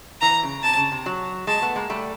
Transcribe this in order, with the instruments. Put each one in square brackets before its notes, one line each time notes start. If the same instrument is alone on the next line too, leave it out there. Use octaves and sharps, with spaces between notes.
[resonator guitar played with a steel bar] E3 [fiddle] A#5
[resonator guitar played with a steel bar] C#3
[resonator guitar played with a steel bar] C3 [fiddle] A5
[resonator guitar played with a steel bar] C#3
C3
F#3
[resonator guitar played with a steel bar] G#3 [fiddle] A5
[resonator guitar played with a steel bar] A3 B3
G#3 A#3
G3 A3